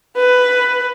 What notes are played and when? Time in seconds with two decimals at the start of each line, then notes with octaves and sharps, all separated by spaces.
0.17 B4